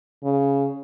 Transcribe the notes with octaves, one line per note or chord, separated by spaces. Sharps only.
C#3